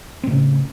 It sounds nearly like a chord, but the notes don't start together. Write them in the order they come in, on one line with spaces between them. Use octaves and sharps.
C4 A2 C#3